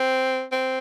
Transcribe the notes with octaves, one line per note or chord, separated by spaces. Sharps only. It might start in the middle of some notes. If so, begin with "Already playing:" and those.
Already playing: C4
C4